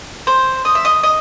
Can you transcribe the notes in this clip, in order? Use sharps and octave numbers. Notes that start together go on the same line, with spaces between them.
C5
D#5
E5
D#5
D#5